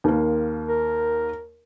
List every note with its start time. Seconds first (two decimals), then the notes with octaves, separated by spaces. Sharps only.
0.04 D#2 A#3
0.68 A#4